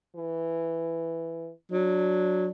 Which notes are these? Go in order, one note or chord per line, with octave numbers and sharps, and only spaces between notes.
E3
F#3 D4